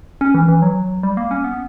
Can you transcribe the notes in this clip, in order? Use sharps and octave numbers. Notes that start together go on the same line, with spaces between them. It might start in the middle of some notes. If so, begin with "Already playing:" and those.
C#4
E3
E3
F#3
G3
A#3
C#4
B3